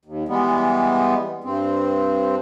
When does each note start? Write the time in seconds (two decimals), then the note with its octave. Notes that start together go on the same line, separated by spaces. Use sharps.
0.05 D#2
0.28 E3 G3 G#3 B3
1.44 G2 C4